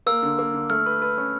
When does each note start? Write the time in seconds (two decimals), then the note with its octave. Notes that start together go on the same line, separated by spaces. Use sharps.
0.07 A#3 E6
0.23 D3
0.39 A#3
0.54 D3
0.70 A3 F6
0.86 B4
1.02 B4
1.17 C#4